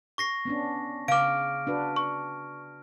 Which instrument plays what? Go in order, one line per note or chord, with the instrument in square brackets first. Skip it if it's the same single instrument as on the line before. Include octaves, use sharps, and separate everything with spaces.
[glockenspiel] C#6 A#6 C7
[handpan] B3 C#4 D4
[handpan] C#3 [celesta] F5 D6 [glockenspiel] F6 D7
[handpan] D4 F#4 B4
[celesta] C#6